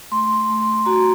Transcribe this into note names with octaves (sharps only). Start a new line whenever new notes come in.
A3 C6
A3
C6
F#4 A#5